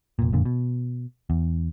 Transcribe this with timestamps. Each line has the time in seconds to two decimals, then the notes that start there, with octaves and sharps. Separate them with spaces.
0.19 F1 A#2
0.32 F#1 F2 A#2 D3
0.45 B2
1.30 E2